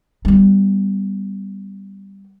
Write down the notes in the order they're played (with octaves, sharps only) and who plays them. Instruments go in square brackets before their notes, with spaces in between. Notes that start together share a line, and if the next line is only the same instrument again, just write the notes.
[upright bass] G3 B3